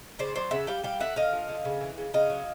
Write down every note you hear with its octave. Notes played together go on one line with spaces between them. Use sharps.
C#3 C5 D5
F#3 C5 D5
C#3 E5 F#5
G3 F5 G5
G3 F5 G5
D3 E5 F#5
D3 D#5 F5
F3
D3
C#3
E3
C#3
C#3 D#5 F5
F#3